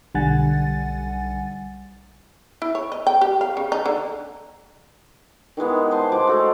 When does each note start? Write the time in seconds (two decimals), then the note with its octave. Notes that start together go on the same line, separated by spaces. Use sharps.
0.15 B1 D3 G3 F#5 G#5 A6
2.62 E4
2.75 C#5
2.92 D#5
3.07 G5
3.21 G4
3.41 F5
3.57 C#3
3.72 D#4
3.86 D3
5.57 D#3 E3 G#3 B3
5.77 G4
5.91 C5 G#5 A5 C6
6.12 F3 G#3 D6
6.27 G#3 A3 F#4